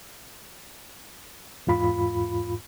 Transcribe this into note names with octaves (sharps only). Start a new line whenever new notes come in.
E2 G#2 F4 B5